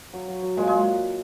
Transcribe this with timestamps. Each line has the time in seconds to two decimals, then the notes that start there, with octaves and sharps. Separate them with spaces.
0.13 F#3
0.28 F#3
0.42 F#3
0.57 A#2 G#3
0.67 G#3